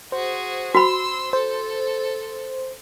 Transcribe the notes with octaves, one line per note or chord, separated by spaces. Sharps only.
F#4 G#4 C5
F#4 B5 C6 E6
A4 C5